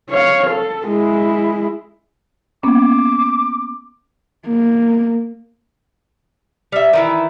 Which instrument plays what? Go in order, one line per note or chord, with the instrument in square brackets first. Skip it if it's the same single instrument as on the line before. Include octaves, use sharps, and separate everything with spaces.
[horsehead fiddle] C#5 F5
A4
G#3 E4
[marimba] A#3 B3 C#4 [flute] D6
[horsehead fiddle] A#3
[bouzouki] G3 E5
D#3 E3 E4